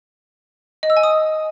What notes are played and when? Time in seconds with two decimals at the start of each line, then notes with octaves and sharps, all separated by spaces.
0.83 D#5
0.90 E6
0.97 G#5
1.03 D#6